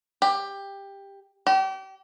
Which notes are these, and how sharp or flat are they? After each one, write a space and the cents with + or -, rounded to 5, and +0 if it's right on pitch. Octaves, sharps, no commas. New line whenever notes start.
G4 +15
G4 -35